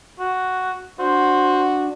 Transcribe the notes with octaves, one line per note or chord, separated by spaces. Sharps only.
F#4
D4 F#4 C5